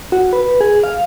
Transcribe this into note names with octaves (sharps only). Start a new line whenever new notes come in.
F#4
B4
G#4
F5